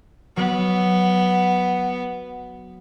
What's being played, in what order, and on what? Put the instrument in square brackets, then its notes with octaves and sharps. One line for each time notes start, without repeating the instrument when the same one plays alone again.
[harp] F#3 [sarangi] B3